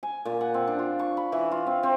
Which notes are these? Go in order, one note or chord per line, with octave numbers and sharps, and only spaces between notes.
G#5
A#2
F#5
C4
D4
F4
C#6
B5
E3
F4
C4
C4